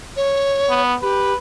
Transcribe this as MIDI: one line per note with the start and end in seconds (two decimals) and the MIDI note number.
0.16 0.82 73
0.69 0.95 59
1.02 1.33 67
1.02 1.36 71